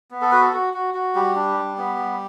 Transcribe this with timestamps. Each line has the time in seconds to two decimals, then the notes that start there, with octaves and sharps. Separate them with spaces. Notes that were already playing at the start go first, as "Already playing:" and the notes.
0.11 B3
0.21 A4
0.31 F#4 B4
0.41 A4
0.53 F#4
0.74 F#4
0.94 F#4
1.15 G3 G4
1.36 D4
1.57 G3
1.78 B3
1.99 G3